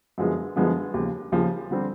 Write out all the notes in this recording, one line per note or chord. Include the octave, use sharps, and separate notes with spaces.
F#2 D3 F3 G#3 B3
F#2 D3 F3 G#3 B3
D#2 C#3 F3
D#2 C#3 F3
D3 G3 C4